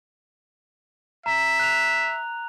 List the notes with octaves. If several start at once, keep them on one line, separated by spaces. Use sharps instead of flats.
E5 A#5
F#6 F7